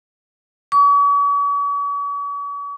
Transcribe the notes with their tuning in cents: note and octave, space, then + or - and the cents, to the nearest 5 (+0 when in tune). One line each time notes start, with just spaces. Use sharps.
C#6 +45